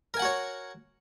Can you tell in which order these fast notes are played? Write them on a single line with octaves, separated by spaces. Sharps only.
A#4 G#5 F#5 F#4 C#5